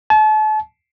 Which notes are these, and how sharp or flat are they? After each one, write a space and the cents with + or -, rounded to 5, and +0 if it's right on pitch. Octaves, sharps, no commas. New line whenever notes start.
A5 -35